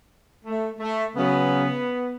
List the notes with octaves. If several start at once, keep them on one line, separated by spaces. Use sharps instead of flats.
A3
A3
C#3 F#3 B3